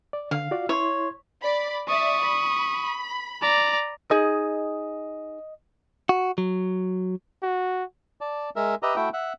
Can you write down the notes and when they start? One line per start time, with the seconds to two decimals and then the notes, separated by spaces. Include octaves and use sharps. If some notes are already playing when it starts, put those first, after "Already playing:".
0.13 D5
0.31 D3 F5
0.51 F4 F#4 D5
0.69 E4 C#5 C6
1.42 D5 B5
1.88 D5 E5 C#6 D#6
2.22 B5
3.41 D5 A#5
4.11 D#4 G#4 D#5
6.09 F#4
6.38 F#3
7.42 F#4
8.21 D5 A5
8.56 G#3 A#4 E5
8.83 G4 B4 D#5 E5 A#5
8.96 A3 E4 F#4 E5 G5
9.13 E5 F#5